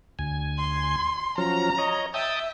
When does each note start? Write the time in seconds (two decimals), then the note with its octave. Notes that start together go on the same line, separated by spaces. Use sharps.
0.19 D2 G#5
0.58 C6
1.38 F3 F#3 C#4 A#5
1.78 C#5 D#5
2.14 E5 G5 A5 D#6